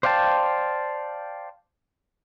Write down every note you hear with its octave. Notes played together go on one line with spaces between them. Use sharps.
C5 D5 F5 G5 A5